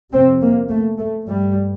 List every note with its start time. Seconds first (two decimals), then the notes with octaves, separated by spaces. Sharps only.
0.12 F2 C3 C4
0.41 A#3
0.70 A3
0.99 A3
1.28 G2 G3